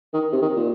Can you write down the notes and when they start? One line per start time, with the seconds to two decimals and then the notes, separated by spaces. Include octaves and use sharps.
0.14 D#3
0.33 C3
0.42 D#3
0.56 A#2